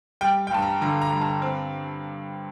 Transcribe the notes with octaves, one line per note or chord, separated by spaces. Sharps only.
G3 G5
G5
G2 A5
A#5
D3 A#5
A#5
G2
A5
C4